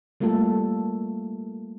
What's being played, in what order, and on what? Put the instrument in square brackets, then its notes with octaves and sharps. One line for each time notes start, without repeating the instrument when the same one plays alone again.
[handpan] G3 A3 A#3 F4 A4